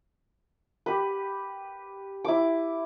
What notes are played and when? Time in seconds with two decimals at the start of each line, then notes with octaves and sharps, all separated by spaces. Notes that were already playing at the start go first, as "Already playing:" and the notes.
0.86 G4 B4
2.24 E4 D6